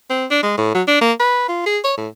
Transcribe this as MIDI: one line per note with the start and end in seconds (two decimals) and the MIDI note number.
0.10 0.26 60
0.31 0.41 62
0.43 0.54 56
0.58 0.70 45
0.75 0.83 54
0.88 0.97 62
1.01 1.13 58
1.20 1.47 71
1.49 1.66 65
1.66 1.79 68
1.84 1.94 73
1.98 2.08 45